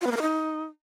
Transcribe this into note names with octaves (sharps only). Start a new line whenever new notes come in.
F4
B3
A#3
A#4
D#4